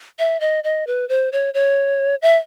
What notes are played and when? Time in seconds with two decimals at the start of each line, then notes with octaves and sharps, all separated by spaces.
0.19 E5
0.41 D#5
0.64 D#5
0.87 B4
1.09 C5
1.32 C#5
1.54 C#5
2.22 E5